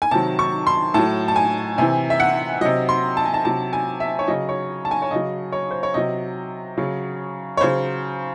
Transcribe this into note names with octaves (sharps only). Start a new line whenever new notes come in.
G#5
C3 D#3 F#3 A5
C#6
C6
A2 F#3 A5
A5
G#5
C3 E3 G#5
E5
F#5
C3 F#3 D#5
C6
A5
G#5
A5
C3 F#3 A5
G#5
E5
C#5
C#3 F#3 D#5
C#5
A5
G#5
C#5
C#3 F#3 D#5
C#5
C5
C#5
C3 F#3 D#5
C#3 F#3
C#5
C#3 F#3 C5